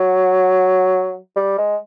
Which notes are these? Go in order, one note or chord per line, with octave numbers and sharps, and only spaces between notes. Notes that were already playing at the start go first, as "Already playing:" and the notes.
Already playing: F#3
G3
G#3